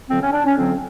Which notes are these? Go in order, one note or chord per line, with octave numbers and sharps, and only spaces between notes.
F2 D3 F#3 C4
C#4
D4
C#4
F2 D3 F#3 C4